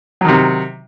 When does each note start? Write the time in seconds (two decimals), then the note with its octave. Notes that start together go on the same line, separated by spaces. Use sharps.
0.21 F#3
0.25 D#3
0.28 C3